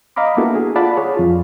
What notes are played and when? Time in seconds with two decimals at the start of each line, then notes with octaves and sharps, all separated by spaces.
0.16 D#5 F5 A#5 B5 D6
0.37 A#3 B3 D4 E4 F#4 A4
0.55 G#4
0.76 F4 D5 F5 F#5 A5 B5
0.97 G#4 C#5
1.17 F2 F4